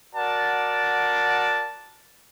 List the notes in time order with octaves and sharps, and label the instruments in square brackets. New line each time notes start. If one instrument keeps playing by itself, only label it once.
[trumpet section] F#4 A#4 D5 F#5 A5